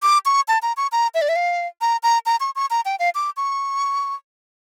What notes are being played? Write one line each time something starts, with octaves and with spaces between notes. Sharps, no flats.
D6
C#6
A5
A#5
C#6
A#5
E5
D5
E5
F5
A#5
A#5
A#5
C#6
C#6
A#5
G5
F5
D6
C#6